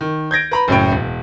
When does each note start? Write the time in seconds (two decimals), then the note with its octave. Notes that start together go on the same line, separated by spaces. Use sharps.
0.01 D#3
0.31 G6 G#6 A#6 D7
0.51 B4 A#5 B5
0.68 F#1 F#2 A2 C#5 G5
0.92 E1